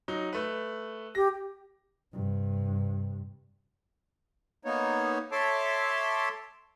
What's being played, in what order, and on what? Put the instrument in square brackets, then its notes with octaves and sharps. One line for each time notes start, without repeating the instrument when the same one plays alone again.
[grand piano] F#3 D#4
A3 B4
[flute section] G4 [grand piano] A#6
[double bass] G2 C3
[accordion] A#3 B3 D#4 C#5
A4 C#5 E5 A5 C6 D6